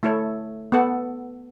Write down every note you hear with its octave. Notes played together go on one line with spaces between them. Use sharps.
A3 E4 A4 C#5
B3 A4 F#5